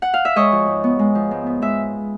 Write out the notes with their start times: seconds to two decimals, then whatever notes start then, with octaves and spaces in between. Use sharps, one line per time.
0.02 F#5
0.14 F5
0.25 E5
0.36 G#3 C#5 D#5
0.52 F3
0.67 G#2
0.84 B3
0.99 G#3
1.15 F3
1.31 G#2
1.47 B3
1.62 G#3 E5